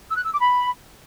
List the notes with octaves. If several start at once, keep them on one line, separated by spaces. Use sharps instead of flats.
E6
F#6
E6
D6
B5